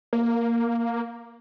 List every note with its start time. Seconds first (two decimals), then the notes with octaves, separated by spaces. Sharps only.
0.13 A#3